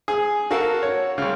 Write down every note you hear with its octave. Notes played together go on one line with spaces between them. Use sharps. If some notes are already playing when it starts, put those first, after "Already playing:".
G#4
F#4 A4 A#4 F5
C#5
C2 C#3